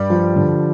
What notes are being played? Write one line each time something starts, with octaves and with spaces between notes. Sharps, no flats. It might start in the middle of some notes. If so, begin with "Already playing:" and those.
Already playing: G2 G3
F3
D3